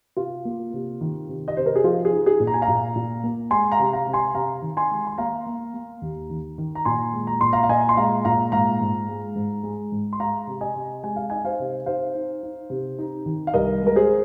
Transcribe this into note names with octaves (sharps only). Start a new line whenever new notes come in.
C3 F4
A#3
C3
D#3
C3
D#5
C3 C5
A#4
G#4
F3 F4
G#4
D#4
G#4
A#2
A#5
G#5
F5 A#5
A#2
A#2
A#3
G#3 G#5 C6
F5 A#5
C3
F5 A#5
C3
G#5 C6
C3 F5 A#5
D#3
G#5 C6
G#3
C6
A#3 F5 A#5
A#3
A#3
D#2
D#3
D#3
A#5
A#2 G#5 C6
G#3
A#5
A#2 C6
F5 A#5
F5
A#2 D#5 G#5
C6
G#3 F5 A#5
A#2 F5 A#5
G#2 F5 A#5
G#2
G#3
G#2
G#3
G#2
C6
G#3 F5 A#5
C3
D#5 G#5
C3
G#3 G#5
F5
D#4 D#5 G#5
C5 F5
C3
D#4 C5 F5
D#4
D#4
C3
D#4
D#3
F5
C2 A#4 D#5
G#3 A#4
G#4 C5